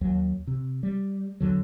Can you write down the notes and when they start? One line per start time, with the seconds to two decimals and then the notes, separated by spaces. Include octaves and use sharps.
0.01 D#2 F#3
0.47 C3
0.83 G3
1.40 E2 D3 F#3